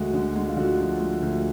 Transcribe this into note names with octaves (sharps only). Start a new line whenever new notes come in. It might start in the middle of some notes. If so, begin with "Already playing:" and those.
Already playing: D2 G#3 F#4
D3
G#3
F4
D3 F#4
F3
G#3
D2